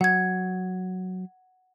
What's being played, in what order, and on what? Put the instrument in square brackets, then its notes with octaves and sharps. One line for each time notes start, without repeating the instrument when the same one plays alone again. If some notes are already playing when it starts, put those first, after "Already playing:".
[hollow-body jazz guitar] F#3 [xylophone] F#5 G#6